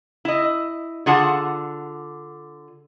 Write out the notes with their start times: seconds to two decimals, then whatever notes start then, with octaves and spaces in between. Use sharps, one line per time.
0.25 E4 D#5
1.06 D3 F4 G#4 F#5 A5